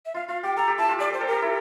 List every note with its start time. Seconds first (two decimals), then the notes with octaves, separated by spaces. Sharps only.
0.06 E5
0.14 F4 F5
0.28 F4 F5
0.43 G4 G5
0.56 A4 A#5
0.68 G4
0.78 E4 A5
0.89 F4
0.99 G4 D5
1.10 A4 C5
1.21 A4
1.27 G4 A#4
1.42 E4